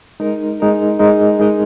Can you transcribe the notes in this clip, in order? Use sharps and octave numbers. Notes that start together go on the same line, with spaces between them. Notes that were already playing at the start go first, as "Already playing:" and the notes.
G#3 D#4 A#4
G#3 D#4 A#4
G#3 D#4 A#4 D#5
G#3 D#4 A#4 D#5